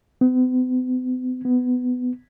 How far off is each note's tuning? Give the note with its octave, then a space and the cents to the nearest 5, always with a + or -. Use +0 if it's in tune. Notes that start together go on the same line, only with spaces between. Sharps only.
B3 +45
B3 +15